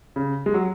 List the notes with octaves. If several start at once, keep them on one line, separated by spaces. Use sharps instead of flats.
C#3
G#3
F#3